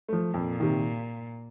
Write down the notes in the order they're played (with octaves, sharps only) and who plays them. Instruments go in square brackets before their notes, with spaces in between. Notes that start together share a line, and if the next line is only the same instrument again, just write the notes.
[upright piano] F3 A3
[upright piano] F2 [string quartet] A#2
[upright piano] C3 D#3